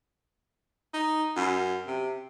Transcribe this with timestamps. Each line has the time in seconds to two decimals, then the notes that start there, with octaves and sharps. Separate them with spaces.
0.94 D#4
1.37 F#2
1.87 C3